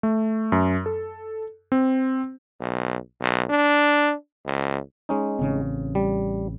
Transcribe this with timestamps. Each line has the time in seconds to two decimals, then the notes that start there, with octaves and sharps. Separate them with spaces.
0.03 A3
0.52 F#2
0.86 A4
1.72 C4
2.60 B1
3.21 B1
3.50 D4
4.46 C#2
5.09 G#3 C#4 D#4
5.39 A1 C#3 C4
5.95 G3